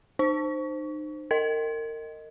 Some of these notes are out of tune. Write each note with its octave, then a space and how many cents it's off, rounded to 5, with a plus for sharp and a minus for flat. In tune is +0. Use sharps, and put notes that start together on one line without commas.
D#4 -35 C5 +0
A#4 -30 D#5 +0